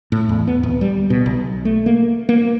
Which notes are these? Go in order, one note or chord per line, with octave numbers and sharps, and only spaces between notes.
A2
E2
B3
D1
G3
B2
B1
A3
A#3
A#3